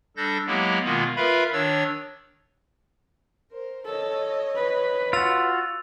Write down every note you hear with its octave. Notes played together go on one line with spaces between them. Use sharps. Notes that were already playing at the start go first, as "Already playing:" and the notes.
G3 D4 A4 G6 A6 A#6
F#3 G#3 A#3 B3 E4 G4
B2 D#3 G#3 A#3 B3 F4
F4 A#4 B4 E5 F5 B5
D#3 D4 C#5 E6 A6
A#4 C5
A4 C#5 D#5
B4
F4 F#4 E6 A6 F7